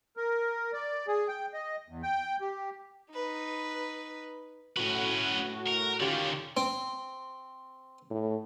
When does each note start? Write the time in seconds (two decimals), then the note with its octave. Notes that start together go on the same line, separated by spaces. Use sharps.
0.17 A#4
0.73 D5
1.07 G#4
1.28 G5
1.54 D#5
1.89 E2
2.03 G5
2.41 G4
3.13 D#4 B4
4.77 A2 C#4 F#4 B4
5.68 A#4
6.00 D3 D#3 C#4 F4 G4
6.57 C4
8.10 A2